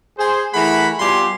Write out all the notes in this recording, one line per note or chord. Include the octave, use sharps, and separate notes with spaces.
G#4 C5
E3 A3 G#4 A#4 F#5 B5
B2 G3 F4 G4 G#5 C6